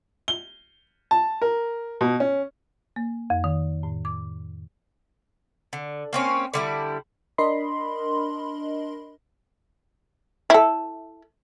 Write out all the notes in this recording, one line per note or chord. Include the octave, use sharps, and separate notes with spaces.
G7
A5
A#4
B2
C#4
A#3
F2
D#3
A2
D6
D3
A#3 C4 C#4
D3 G3 E4
D4 A#4 D#5 B5 C6
E4 A4